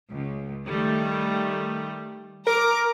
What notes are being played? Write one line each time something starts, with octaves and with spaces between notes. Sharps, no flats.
C#2
D#3 G3 A3
A#4 A#5 D6